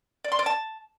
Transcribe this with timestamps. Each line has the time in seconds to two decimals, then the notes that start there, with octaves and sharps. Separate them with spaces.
0.24 D5
0.32 C6
0.39 D5
0.46 A5